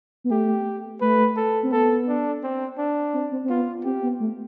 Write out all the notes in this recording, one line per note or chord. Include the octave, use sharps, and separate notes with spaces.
B3
A3 G4
A3 B4
A4
C4
B3 A4
D4
C4
D4
C4
C4
C4
B3 F4
C4 G4
B3
A3